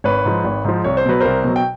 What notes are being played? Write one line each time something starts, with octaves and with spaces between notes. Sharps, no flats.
G#1 B4 C#5
G#2 F3
G#1
G#2 F3
C2 C#5
C5
B2 F#3 B4
C2 A#4 C5
B2 F#3
G5